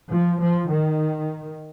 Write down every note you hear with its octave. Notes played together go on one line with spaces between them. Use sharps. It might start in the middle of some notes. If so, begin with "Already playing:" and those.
F3
F3
D#3